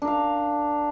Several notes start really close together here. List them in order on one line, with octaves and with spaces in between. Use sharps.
D4 A#4 F5